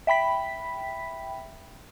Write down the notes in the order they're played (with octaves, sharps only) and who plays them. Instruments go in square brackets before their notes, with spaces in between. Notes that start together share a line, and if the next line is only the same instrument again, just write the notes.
[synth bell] E5 G5 B5 B6